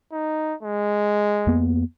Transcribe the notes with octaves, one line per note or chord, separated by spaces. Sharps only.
D#4
G#3
F2 A#3 B3